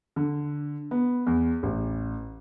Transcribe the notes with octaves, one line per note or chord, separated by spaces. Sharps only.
D3
B3
E2
A1